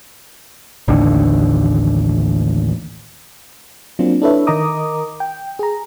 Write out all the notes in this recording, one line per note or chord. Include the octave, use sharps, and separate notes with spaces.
A1 D#2 D3
F#3 A#3 C4 D4 F4
D4 E4 A4 B4 C#5 E5
D#3 A#4 D#5 A#5 D6 D#6
G5
G#4 A#5